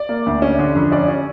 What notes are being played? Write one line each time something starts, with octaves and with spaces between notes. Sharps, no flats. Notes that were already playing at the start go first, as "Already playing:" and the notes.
Already playing: D5
A#3
D2
C#4
D3
F2
C#4 D5
C#4